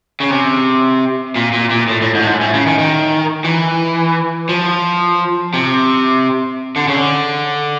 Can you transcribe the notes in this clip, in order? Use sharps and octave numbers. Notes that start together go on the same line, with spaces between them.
C#3
C3
A#2
A#2
A#2
A2
A2
G#2
A2
G#2
A2
C#3
D#3
D#3
E3
F3
C3
D3
C#3
D3